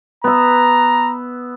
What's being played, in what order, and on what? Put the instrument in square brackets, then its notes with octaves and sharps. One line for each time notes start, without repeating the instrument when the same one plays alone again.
[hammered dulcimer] B3 E5 [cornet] A#5